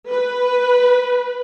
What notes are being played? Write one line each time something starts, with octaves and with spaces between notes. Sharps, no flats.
B4